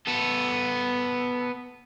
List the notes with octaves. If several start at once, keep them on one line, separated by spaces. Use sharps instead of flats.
B3 A4